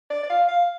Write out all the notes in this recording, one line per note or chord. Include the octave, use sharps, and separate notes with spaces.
D5
D5
F5
F5